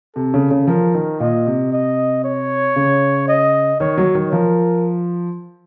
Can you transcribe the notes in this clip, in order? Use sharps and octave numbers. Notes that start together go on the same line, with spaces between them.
C3 A4
C#3
C#3
F3 A#4
D#3
A#2 D#5
C3
D#5
C#5
C#3
D#5
D#3 C#5
F#3
D#3
F3 A#4